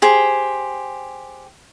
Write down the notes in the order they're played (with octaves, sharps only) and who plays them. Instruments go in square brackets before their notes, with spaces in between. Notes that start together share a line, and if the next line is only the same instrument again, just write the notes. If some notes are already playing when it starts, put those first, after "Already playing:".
[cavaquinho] G4 G#4 C5